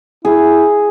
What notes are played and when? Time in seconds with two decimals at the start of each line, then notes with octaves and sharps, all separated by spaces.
0.25 E4 G#4